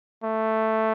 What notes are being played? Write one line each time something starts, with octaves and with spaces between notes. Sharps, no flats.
A3